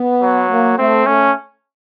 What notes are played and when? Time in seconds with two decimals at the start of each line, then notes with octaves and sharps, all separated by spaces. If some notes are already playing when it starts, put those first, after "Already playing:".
Already playing: B3
0.22 F#3
0.49 A#3
0.78 A3 C4
1.06 A3 C#4